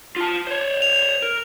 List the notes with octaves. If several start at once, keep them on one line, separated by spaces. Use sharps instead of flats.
F4 A5
C5 C#5
F7
A#4